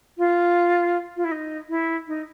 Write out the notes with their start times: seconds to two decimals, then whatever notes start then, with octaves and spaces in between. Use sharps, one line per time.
0.17 F4
1.16 F4
1.24 E4
1.31 D#4
1.69 E4
2.07 D#4